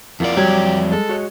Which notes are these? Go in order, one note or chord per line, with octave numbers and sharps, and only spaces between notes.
F2 A#3 E4 F4 D5 F#5
F#3 G3 G4 G#6
G#3 A4
F#4 C#5 D#5